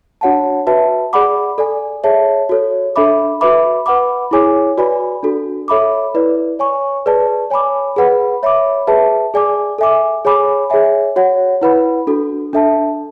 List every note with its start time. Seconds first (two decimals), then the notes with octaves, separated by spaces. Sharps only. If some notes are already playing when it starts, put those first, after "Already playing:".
0.21 D4 F#4 C#5 F#5 A5
0.67 F#4 B4 E5 A5
1.13 G#4 D5 F#5 B5 D6
1.58 A4 D5 G#5
2.04 G#4 C#5 E5 A5
2.49 F#4 A4 C#5
2.96 D4 A4 E5 B5 D6
3.41 F#4 B4 E5 B5 D6
3.86 B4 F#5 B5 D6
4.31 E4 G#4 C#5 G#5 D6
4.78 F#4 B4 D5 G#5 B5
5.23 D4 F#4 A4
5.68 A4 C#5 E5 B5 D6
6.15 E4 B4 D5
6.59 C#5 G#5 C#6
7.06 G#4 B4 D5 A5
7.50 C#5 G#5 B5 D6
7.96 G#4 B4 F#5 B5
8.43 C#5 E5 B5 D6
8.87 G#4 B4 E5 A5
9.34 G#4 D5 G#5 D6
9.78 A4 E5 G#5 D6
10.25 G#4 C#5 G#5 B5 D6
10.70 G#4 C#5 E5 G#5
11.16 F#4 C#5 F#5
11.62 E4 B4 F#5 B5
12.07 D4 F#4 A4
12.53 D4 A4 E5 A5